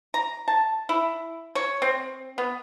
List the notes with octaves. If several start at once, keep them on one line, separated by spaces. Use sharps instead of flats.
A#5
A5
E4
C#5
C4
B3